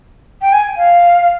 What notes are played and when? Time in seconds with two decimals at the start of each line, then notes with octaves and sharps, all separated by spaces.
0.42 G5
0.53 G#5
0.77 F5